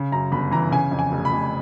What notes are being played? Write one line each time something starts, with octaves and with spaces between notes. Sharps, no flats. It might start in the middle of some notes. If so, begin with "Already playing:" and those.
Already playing: C#3
F#2 A#5
G1 B5
E3 A#5
C#3 G#5
F2
G#5
F1
B5
F1